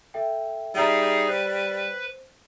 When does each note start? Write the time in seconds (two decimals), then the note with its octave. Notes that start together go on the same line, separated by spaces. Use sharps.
0.14 A4 E5 G5
0.75 G3 D#4 G#4 E5 A#5
1.28 B4 C5